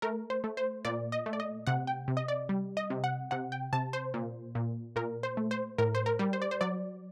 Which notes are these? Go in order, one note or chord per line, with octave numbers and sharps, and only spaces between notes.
A3 A#4
C5
A3
C5
A#2 D5
D#5
A3
D5
D#5
C3 F#5
G5
C3
D#5
D5
G3
D#5
C3
F#5
C3 F#5
G5
C3 A5
C5
A#2
A#2
A#2 A#4
C5
A3
C5
A2 A#4
C5
A#4
G3
C5
D5
C5
F#3 D5